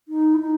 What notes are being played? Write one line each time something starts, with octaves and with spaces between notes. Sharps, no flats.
D#4
E4
D#4